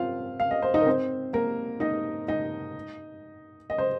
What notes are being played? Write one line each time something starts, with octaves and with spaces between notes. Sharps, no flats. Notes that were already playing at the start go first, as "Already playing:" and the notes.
Already playing: C4 F4 F5
F5
D#5
C5
D#4 D#5
A#4
C4 C5
A#3 A#4
D#4 D#5
D#4 D#5
D#5
C5